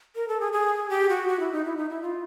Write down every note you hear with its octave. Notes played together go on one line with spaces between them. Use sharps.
A#4
A4
G#4
G#4
G4
F#4
F#4
E4
D#4
E4
D#4
E4
F4